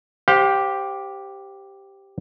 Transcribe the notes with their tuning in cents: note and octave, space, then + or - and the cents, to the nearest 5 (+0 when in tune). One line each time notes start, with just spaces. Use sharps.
G4 +0 C5 +0 F5 +40